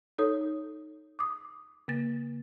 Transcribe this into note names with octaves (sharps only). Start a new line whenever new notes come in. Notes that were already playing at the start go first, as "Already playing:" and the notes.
D#4 A4 C#5 D#6
D6 D#6
C#3 A#3 A6